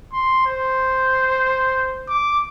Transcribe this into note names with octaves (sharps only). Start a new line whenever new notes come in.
C6
C5
D6